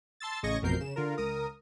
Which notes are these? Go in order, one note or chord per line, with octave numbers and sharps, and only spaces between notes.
A5 C6 E6 A6
A1 C#3 D#5 C#6 G#6 A#6
A1 F2 B2 A#4 G6 C7
C#3 E7
D3 F4 A#4
C#2 A#4 D#6